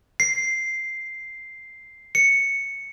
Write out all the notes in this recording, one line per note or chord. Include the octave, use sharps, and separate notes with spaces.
C7
C#7